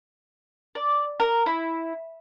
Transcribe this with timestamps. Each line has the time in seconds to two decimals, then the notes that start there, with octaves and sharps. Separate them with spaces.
0.75 D5
1.20 A#4
1.46 E4